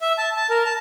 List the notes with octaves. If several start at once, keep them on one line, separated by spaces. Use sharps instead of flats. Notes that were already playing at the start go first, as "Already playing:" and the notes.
E5
A5
A5
A#4
A5